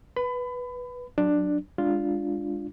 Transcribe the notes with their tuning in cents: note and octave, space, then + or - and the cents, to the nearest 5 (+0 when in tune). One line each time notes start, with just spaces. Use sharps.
B4 -5 B5 +25
F#3 +0 D4 +10
G#3 -25 D4 +0 F4 +0